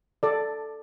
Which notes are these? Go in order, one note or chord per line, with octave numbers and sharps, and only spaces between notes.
A4 D5